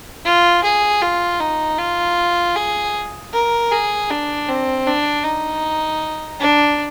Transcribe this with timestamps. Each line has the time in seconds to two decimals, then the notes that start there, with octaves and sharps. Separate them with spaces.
0.25 F4
0.64 G#4
1.02 F4
1.41 D#4
1.79 F4
2.56 G#4
3.33 A#4
3.72 G#4
4.10 D4
4.49 C4
4.87 D4
5.25 D#4
6.40 D4